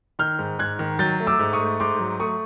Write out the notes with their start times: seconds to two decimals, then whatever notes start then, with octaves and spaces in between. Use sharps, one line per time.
0.19 D#3 F6 G6
0.39 G#2
0.59 G#2 F#6 G#6
0.79 D#3
0.99 F#3 G6 A6
1.20 A3
1.27 D6 E6
1.39 G#2
1.53 C#6 D#6
1.60 A3
1.80 G#2 C6 D6
2.00 F#3
2.20 A3 C#6 D#6